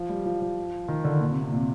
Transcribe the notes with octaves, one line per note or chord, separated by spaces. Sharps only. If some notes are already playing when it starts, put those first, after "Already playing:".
Already playing: F3
G3
F3
F3
D#3
D3
A#2
C3
C3
A#2